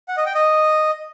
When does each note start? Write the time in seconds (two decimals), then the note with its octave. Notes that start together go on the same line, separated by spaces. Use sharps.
0.08 F#5
0.17 D#5
0.26 G5
0.35 D#5